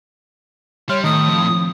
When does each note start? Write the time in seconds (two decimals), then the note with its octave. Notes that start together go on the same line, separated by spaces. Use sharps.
0.89 G3 C#5 E5 C6 F6
1.04 A2 D#3 D#6
1.28 F3 C4